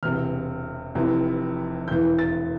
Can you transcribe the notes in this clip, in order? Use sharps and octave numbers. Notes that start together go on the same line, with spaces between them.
E1 E2 C3 F6
F1 F2 C3 E3
E1 E2 E3 G6
A6